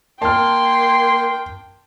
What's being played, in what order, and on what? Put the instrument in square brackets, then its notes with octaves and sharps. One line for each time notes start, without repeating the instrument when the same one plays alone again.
[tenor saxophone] A#3 [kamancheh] G5 [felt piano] A5 F6 [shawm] C6